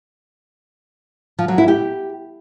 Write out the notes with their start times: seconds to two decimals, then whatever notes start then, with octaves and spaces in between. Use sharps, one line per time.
1.39 F3
1.48 F#3
1.58 E4
1.68 G4